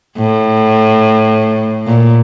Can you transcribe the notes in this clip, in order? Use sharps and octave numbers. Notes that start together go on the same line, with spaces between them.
A2
A#2